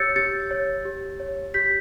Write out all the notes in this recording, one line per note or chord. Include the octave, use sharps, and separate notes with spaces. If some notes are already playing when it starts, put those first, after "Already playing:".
Already playing: G4 C#5 E6 G6 A6 C#7
G4 A6 C#7
C#5
G4
C#5
G4 G6 B6